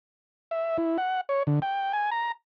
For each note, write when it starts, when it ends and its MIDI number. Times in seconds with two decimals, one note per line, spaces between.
0.51 0.77 76
0.78 0.97 64
0.98 1.21 78
1.29 1.43 73
1.47 1.60 50
1.62 1.92 79
1.93 2.10 80
2.11 2.32 82